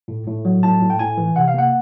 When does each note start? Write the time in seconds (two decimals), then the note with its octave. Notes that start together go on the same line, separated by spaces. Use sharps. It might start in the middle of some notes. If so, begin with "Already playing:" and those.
0.08 A2
0.27 A2
0.45 F#3
0.63 A2 A5
0.81 A2
0.90 G5
0.99 A2 G#5
1.17 E3
1.36 C3 F#5
1.48 F5
1.54 A#3 F#5